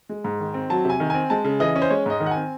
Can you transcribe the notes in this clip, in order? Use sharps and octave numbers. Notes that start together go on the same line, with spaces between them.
G#3
G#2
D#3
C4
F#3 A5
C3 G#5
D#3
C4 G#5
G#3 A5
C#3
E3 D#5
C#4
C5
G#3 C#5
G#2 D#5
D#3
F#5
C4 G#5